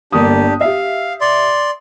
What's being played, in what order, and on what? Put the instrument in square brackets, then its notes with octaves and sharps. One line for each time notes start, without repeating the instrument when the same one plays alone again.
[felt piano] G1 A#3 D#6 [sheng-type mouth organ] D4 G4
[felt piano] G4 E5 [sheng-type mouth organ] F5
[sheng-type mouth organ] D5 C6